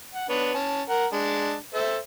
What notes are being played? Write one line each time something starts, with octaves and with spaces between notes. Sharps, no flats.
F#5
B3 D4 C#5
C#4 A5
A#4 F#5
G#3 D4
A4 C5 E5